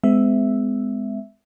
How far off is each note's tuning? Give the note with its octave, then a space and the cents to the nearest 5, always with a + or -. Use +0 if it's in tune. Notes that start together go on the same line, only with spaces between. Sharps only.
G#3 +0 B3 +45 E5 +0